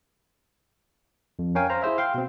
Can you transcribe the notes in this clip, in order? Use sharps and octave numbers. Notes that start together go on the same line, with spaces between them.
F2
C#4 A#4 C#5 F5 G5 G#5
C5 F5 A#5
E4 G#4 C5 E5
F5 G5 C6
B2 C4